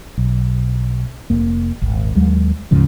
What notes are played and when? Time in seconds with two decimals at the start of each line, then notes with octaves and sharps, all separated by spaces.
0.18 B1
1.30 F1 F2 A#3
1.81 D#1 G#1
2.15 D#2 F#3 G#3
2.71 D2 G#2 C#3 F3